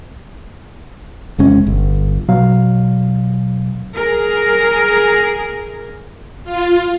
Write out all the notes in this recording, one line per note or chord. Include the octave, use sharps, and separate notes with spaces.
E1 C3 G#3 C#4
G1
B2 F#3 F5
G#4 A#4
F4